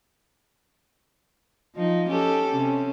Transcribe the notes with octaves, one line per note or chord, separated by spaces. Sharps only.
F3 D#4
C#4 G4 A4
C3 C#4